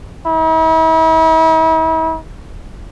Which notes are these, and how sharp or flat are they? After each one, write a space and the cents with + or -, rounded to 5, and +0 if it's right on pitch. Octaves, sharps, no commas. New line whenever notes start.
E4 -45